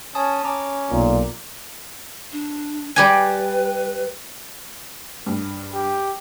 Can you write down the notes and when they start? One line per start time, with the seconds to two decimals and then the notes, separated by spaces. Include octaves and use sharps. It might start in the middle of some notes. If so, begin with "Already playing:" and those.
0.15 C#4 G#5 A5 D#6
0.44 C#4 A#5 D6
0.91 B1 A#2
2.33 D4
2.96 G3 G4 B4 G#5
5.26 G2
5.73 G4